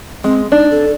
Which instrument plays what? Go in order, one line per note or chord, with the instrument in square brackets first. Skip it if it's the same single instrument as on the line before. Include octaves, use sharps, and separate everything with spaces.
[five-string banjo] G#3 [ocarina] C4
[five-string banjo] D4 [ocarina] D#4
[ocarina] A4